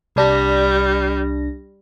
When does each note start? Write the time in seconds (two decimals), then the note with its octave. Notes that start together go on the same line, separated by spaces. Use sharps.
0.16 C2 G3 D4 A#6